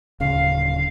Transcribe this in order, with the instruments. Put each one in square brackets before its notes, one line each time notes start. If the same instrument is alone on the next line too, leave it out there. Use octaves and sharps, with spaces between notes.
[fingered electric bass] D1 C#3 [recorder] F5